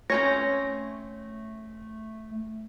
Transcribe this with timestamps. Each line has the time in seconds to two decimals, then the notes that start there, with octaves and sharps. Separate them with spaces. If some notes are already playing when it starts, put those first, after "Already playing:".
0.10 A3 C4 C#4 C#5 A#6